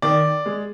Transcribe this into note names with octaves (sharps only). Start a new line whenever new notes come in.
D#3 D5
G#3